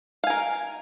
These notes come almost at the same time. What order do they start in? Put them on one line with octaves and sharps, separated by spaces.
F5 G#5 A#4